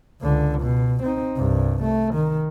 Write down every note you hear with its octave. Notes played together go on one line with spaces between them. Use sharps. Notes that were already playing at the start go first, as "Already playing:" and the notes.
C#2 D3
B2
C4 D#4
C2 G2
A3
D#3